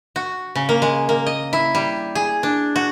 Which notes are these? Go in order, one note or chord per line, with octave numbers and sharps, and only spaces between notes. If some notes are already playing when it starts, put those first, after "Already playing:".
F#4
C#3
A#3
G#3
A#3
D#5
E4
G3
G#4
D4
F#4